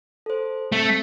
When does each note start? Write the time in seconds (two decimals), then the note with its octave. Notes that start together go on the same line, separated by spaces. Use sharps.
0.26 A4 C5
0.72 A3 C4